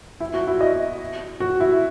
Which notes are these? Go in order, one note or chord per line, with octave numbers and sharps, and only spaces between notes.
E4
F#4
E4
D#5
F#4
E4